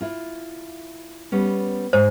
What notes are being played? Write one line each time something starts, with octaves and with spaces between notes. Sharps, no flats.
E4 F4
G3 B3 C#4
G#2 C5